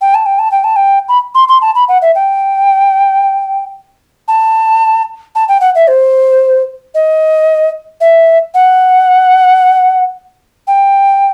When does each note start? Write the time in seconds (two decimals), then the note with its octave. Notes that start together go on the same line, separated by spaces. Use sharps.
0.01 G5
0.14 A5
0.26 G5
0.39 A5
0.52 G5
0.64 A5
0.76 G5
1.09 B5
1.35 C6
1.49 C6
1.62 A5
1.75 B5
1.89 F#5
2.02 E5
2.15 G5
4.28 A5
5.35 A5
5.48 G5
5.61 F#5
5.75 E5
5.88 C5
6.95 D#5
8.01 E5
8.54 F#5
10.67 G5